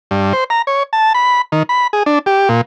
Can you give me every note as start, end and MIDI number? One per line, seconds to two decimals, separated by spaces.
0.11 0.33 43
0.33 0.44 72
0.50 0.62 82
0.67 0.83 73
0.93 1.13 81
1.14 1.41 83
1.52 1.63 51
1.69 1.87 83
1.93 2.03 68
2.06 2.19 62
2.26 2.49 67
2.49 2.61 46